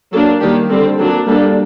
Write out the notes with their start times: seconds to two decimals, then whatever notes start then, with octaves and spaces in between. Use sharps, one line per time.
0.12 F#3 A#3 D4 A4
0.41 D#3 G3 A#3 G4
0.69 D3 G3 C4 A4
0.99 D3 F#3 A#3 D4 A4
1.28 G3 A#3 D4 A4